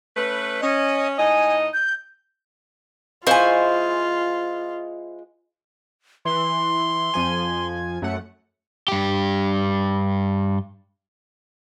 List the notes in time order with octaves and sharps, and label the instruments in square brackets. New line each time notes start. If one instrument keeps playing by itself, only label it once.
[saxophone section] A3 C#4 B4
[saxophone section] C#4 [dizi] D#5
[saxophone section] A2 D#4 D#5 [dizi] G#5
[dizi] G6
[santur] G#3 [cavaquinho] E4 C5 C#6 [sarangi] F4 [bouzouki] F5 G#5
[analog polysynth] E3 [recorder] C6
[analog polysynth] F2 F3 G#5
F#2 A3 F#5
[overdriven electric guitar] G2 G4